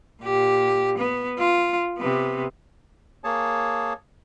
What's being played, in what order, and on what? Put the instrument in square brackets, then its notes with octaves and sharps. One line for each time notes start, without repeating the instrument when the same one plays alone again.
[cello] A#2 G4
B3
F4
C3 B3
[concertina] A#3 G#4 C#5 A5